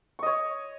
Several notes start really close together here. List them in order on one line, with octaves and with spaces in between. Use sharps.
C#6 D#5 C#5